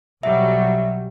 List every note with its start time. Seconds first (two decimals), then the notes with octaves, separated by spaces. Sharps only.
0.23 B1 F#3 G3 E5